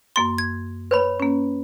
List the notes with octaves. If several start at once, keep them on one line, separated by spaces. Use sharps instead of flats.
F#2 A#3 C6 A6
G#6
B4 C#5 B5
A#3 C#4